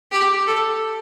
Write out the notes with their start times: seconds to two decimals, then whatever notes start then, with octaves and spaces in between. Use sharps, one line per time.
0.11 G4
0.47 A4